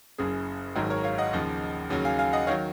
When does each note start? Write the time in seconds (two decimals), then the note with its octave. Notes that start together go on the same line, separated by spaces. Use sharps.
0.18 F#1 F#2 C#3 G#4
0.75 G#1 G#2 D#3 F#3 A#4
0.90 A#4 C#5
1.04 C#5 F5
1.18 D#5 F#5
1.33 D#2 C#3 F3
1.90 D#2 C#3 F#3
2.05 F5 G#5
2.19 F5 G#5
2.33 D#5 F#5
2.47 D#3 F#3 C#5 F5